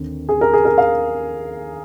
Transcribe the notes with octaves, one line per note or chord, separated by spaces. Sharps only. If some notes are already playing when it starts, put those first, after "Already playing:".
Already playing: D#2 D3 C4
G#4
A#4
G#4
A#4
F5